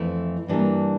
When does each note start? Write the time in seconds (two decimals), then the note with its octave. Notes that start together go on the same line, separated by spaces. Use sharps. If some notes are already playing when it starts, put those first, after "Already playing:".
Already playing: F2 E3 A3 E4
0.48 G2 E3 G3 A#3 D4